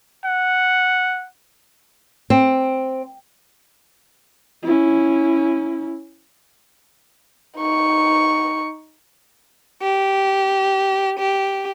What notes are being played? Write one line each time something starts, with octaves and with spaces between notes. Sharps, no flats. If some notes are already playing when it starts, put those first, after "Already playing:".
F#5
C4
C#4 E4
D#4 C#6
G4
G4